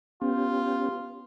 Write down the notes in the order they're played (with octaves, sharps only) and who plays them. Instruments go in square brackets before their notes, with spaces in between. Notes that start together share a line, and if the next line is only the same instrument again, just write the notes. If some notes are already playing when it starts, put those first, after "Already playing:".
[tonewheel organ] B3 C#4 G4 [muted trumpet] F4